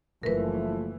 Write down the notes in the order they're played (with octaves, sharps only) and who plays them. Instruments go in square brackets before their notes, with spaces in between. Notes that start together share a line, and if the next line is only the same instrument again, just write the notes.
[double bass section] F#1 E3 [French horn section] F3 A3 [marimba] A#4 B4